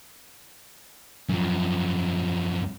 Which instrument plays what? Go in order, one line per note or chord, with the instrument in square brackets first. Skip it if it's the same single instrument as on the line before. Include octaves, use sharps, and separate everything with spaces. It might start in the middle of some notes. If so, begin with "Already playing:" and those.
[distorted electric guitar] F#2 F3